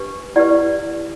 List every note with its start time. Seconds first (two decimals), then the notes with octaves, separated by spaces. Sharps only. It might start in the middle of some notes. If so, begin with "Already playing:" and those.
Already playing: D4 G4 B4
0.36 E4 G4 B4 D5 F#5